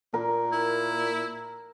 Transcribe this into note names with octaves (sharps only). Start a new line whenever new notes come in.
A#2 A#4
E4